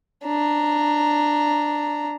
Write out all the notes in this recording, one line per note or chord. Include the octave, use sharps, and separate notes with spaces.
D4 A#5